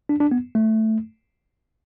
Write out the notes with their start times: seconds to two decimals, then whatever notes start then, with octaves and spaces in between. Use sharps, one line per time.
0.09 D4
0.20 D4
0.31 B3
0.55 A3